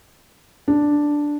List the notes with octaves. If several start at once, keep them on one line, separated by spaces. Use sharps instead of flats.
D4